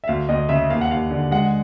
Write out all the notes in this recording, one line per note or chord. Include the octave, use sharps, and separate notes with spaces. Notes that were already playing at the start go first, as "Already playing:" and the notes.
E5
D2 F5
D2 D#5
C#3 E5
D#2 F5
F#5
D#2 F5
D3
G#3 F#5